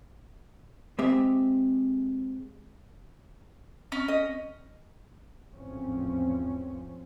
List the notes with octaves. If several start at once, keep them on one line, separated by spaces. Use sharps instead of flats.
G#3 C4 G4 E5
C#4
D#5
G#1 E2 A2 F3 C4 C#4